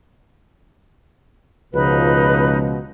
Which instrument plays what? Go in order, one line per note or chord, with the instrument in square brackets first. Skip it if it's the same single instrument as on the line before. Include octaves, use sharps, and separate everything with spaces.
[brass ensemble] C#2 B2 F3 [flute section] D#4 B4